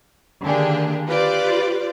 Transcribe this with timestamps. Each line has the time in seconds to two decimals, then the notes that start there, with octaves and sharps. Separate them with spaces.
0.42 D3 D#3 A#3 D4 G4 G#4
1.08 F4 G4 B4 C5 D5